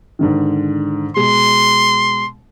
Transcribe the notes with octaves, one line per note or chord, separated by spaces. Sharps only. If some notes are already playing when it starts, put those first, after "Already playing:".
G#2 D3 D#3
B2 G#3 C6